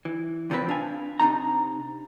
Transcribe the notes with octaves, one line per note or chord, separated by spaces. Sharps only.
E3
E2 C3 F3 C4 B4
D4 F5 G#5
C3 D4 D#4 A#5